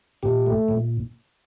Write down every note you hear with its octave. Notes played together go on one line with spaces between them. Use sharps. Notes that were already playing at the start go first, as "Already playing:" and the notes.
A#2 G4
A3
A#2